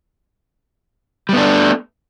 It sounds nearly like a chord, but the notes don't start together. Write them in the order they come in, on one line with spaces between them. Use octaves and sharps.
G3 B3 D4 A3